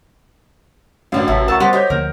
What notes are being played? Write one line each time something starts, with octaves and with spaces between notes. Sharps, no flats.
A1 F#2 D3 A#3 C#4 D4 F5
G#1 C3 E5 A5
C#2 A#4 F#5 A5 C#6 E6
G3 B3 F4 G4 C5 F#5
G4 C5 C#5 D#5 G6
D2 F3 A#3 A#4